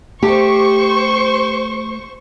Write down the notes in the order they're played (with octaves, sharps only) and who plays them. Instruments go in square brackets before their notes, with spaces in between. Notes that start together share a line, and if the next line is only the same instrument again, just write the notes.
[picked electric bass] A3 [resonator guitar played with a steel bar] G4 [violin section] C5 C#6